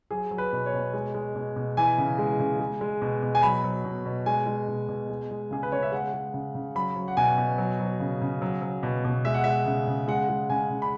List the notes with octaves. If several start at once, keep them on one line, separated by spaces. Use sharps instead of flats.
F#3 G#4
F#3
B4
B2
C#5
B2
G#3
G#3
B2
B2
E3 G#5
C#3
G#3
C#3
G#3
G#3
B2
B2
G#5
F#3 B5
F#3
B2
B2
G#3 G#5
G#3
B2
B2
G#3
G#3
C#3 G#4
B4
C#3 C#5
E5
G#3 F#5
G#3
C#3
C#3
F#3 B5
F#3
F#5
B2 G#5
B2
F#3
F#3
C#3
C#3
F#3
F#3
B2
B2
G#3 E5
F#5
G#3 E5
C#3
C#3
G#3 F#5
G#3
C#3 G#5
C#3
B5